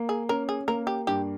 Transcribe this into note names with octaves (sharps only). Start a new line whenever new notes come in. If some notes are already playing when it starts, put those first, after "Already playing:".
Already playing: A#3
G#4
C#4 A#4
G#4
A#3 A#4
G4
G2 G4